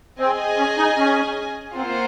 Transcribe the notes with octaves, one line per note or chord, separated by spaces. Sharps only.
C4 G#4 D#5 G#5
C#4
D#4
C#4
A#3 C4 F4 C5 F#5